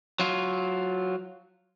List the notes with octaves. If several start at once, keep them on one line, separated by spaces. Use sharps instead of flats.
F#3 F4